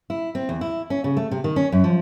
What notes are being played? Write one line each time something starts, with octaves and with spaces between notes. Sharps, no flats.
E4
C4
E2
E4
C#4
C#3
A3
C3
D#3
C#4
F#2
F3